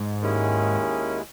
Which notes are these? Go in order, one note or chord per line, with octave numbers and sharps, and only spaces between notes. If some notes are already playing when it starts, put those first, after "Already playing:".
Already playing: G#2
D#2 D#3 G#3 C#4 E4